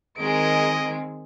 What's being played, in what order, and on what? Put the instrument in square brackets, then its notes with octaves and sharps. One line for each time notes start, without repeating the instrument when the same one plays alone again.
[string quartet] D#3 G#3 C4 [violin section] G#4 A#4 D7 [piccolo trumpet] D#5